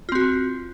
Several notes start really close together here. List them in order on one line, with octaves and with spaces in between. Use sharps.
F4 C4 F#4